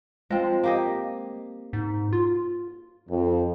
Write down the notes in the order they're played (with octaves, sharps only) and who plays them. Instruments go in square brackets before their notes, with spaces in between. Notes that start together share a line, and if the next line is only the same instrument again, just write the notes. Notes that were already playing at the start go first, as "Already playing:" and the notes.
[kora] F3 C4 [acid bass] G#3
[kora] A#3 G4 D#5
[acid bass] G#2
F4
[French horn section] F2